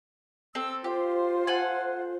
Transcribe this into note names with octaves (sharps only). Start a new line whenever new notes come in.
C4 A4 E6
F4 G4 C5
A4 F#5 G#5